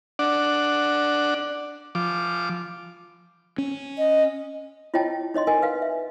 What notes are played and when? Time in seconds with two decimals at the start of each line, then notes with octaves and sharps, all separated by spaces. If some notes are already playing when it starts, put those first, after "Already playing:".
0.19 D4 D5 F#5
1.95 F3 D6
3.58 C#4
3.98 D#5
4.94 E4 F4 C#5 D#5 G5 A5
5.34 D#4 C#5 D#5 C6
5.47 A#4 D#5 G#5
5.62 B4 F5 F#5
5.82 E5